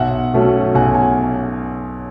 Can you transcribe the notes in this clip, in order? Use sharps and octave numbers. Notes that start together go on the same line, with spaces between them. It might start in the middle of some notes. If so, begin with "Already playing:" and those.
Already playing: B1 E5 F#5
B2 F#3 A3 C#4
B1 F#5 G#5
G#5